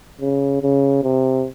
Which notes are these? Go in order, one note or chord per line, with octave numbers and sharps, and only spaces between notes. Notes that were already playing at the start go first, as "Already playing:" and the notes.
C#3
C#3
C3